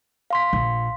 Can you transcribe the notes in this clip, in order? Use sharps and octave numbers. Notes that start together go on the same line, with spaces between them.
F5 C6 B6
A#1